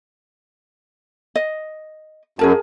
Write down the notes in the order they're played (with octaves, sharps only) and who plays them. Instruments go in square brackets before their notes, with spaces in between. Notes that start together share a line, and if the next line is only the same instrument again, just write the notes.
[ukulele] D#5
[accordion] F#2 [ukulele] G#4 A#4 A5